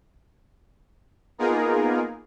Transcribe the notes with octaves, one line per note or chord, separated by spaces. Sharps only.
A#3 B3 D#4 F4 G#4 A#4